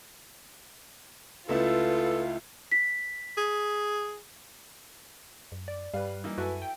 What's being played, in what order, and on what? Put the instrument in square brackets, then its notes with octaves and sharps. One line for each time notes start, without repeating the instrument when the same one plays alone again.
[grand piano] C#2 A3 E4 [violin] F4 [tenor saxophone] A4 [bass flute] B4
[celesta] B6
[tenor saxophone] G#4
[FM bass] F#2
[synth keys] D5
[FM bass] G2 [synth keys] G3 [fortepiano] B4 F5
[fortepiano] E3 A#3 D#4
[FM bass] F#2 [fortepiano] E4 A4 G#5 [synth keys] F#4 B4
[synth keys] G5